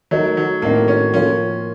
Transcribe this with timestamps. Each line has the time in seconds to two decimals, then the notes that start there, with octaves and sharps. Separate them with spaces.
0.11 F#3 A3 D#4 A#4 C#5
0.37 F#3
0.62 A2 A3 A#3 C4 D#4 F#4
0.88 C#4
1.13 F3 A#3 C#4 F4 A#4